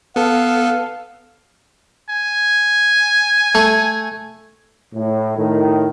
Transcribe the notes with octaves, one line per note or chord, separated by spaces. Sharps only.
B3 A4 F5
G#5
A3
A2
A2 D#3